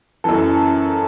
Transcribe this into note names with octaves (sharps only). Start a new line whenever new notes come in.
F#2 E3 A4